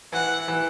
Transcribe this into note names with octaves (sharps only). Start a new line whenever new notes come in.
E3 F#5
E3